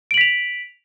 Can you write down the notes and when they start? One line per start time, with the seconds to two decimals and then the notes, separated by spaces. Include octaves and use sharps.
0.11 D7
0.14 F#7
0.18 B6
0.21 F7